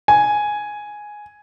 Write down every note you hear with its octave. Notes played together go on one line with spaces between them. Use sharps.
G#5